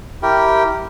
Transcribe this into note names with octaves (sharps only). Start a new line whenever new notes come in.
E4 G4 A#4 G5